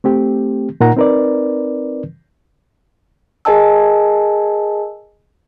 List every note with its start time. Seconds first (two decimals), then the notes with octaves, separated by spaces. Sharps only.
0.04 A3 C4 G4
0.81 A#2 D#4 A#4 F#5 A#5
0.96 C4 D#4 A#4 B4 D5
3.45 G#4 A#4 D#5 G#5 A5 E6